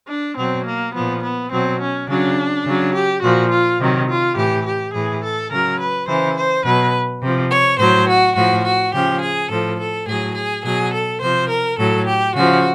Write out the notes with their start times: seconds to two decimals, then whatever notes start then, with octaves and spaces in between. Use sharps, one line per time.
0.08 D4
0.36 B2 F#3 C4
0.65 A#3
0.94 A#2 F3 B3
1.23 B3
1.51 B2 F#3 C4
1.80 C#4
2.08 C#3 F#3 D4
2.65 C#3 F#3
2.94 G4
3.23 A#2 F3 F#4
3.51 F4
3.79 C3 D#3 F#3
4.08 F4
4.36 A2 E3 G4
4.65 G4
4.93 A2 E3 G#4
5.22 A4
5.50 C#3 F#3 A#4
5.79 B4
6.07 C#3 E3 C5
6.36 C5
6.64 B2 F#3 B4
7.21 C3 F3
7.50 C#5
7.78 A2 F#3 C5
8.07 F#4
8.35 A2 F3 F#4
8.64 F#4
8.93 C#3 F3 G4
9.21 G#4
9.49 A2 F3 A4
9.79 A4
10.07 A2 F#3 G#4
10.35 G#4
10.63 B2 F#3 G#4
10.92 A4
11.21 C3 F3 C5
11.50 A#4
11.78 A2 F#3 A4
12.06 G4
12.35 C#3 F3 F#4